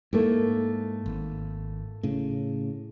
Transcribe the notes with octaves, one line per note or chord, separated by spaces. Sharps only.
G#2 A3 A#3 E4
G#1
A2 C#3